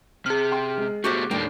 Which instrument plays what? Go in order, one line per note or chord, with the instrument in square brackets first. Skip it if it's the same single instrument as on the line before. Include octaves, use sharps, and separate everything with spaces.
[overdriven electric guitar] C3 [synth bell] G#4 F6
[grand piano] G5 C6
G#3
[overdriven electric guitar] B2 A3 [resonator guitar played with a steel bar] F#4 G4 C5 [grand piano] G6
[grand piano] D#2 A2 [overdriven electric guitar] A#3 D4 [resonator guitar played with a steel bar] G5